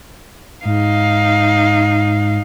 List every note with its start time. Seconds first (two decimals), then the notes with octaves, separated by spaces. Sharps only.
0.65 G#2 D#4 F5